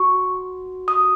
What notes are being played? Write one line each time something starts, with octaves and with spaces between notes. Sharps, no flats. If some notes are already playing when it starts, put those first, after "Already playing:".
Already playing: F#4 C#6
D#6